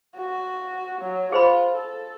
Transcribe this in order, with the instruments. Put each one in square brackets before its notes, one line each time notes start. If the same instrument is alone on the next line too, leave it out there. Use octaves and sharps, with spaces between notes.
[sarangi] F#4
F#3
[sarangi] F4 [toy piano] G#4 C5 B5
[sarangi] A4